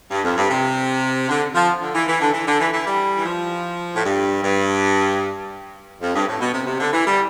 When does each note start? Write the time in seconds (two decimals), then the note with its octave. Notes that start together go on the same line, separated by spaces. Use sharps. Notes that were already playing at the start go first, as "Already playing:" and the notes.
0.11 G2
0.24 F2
0.37 G2
0.51 C3
1.29 D3
1.55 F3
1.82 D3
1.94 E3
2.08 E3
2.21 D3
2.34 E3
2.47 D3
2.60 E3
2.73 E3
2.86 G3
3.17 E3
3.26 F3
3.96 A2
4.05 G2
4.44 G2
6.02 F2
6.15 G2
6.28 A2
6.41 B2
6.54 C3
6.67 C3
6.80 D3
6.93 E3
7.07 G3